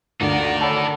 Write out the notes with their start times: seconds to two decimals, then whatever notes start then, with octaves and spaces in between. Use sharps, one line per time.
0.21 D2 G2 D#4 F4 A#4 D5
0.61 A4 C#5 B5